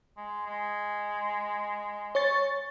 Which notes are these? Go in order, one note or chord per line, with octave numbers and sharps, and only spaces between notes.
G#3
G#3
C#5 C#6 A6